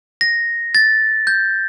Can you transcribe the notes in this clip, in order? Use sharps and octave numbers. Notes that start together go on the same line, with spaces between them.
A#6
A6
G6